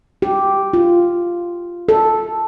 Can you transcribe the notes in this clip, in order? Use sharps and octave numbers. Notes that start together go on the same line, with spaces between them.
G4
F4
A4